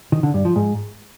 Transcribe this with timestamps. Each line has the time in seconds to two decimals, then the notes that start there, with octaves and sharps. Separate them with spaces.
0.12 D#3
0.23 D3
0.34 G2
0.45 F3
0.56 G#2